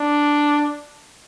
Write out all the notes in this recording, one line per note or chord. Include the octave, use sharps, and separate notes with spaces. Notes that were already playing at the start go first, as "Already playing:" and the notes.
Already playing: D4